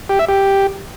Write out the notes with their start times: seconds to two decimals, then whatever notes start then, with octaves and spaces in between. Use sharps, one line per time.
0.09 G4
0.19 E5
0.29 G4